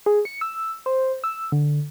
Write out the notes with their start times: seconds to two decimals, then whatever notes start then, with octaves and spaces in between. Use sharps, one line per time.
0.06 G#4
0.25 C#7
0.41 E6
0.86 C5
1.24 E6
1.52 D3